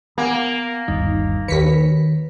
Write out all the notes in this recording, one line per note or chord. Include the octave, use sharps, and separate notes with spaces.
A#3 B3 F#5 G#5
G1 D#2 G3 D#4
D#2 D#3 B4 C#5 B6 C#7